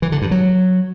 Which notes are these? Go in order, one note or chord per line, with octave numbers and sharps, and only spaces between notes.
E3
D3
G2
F#3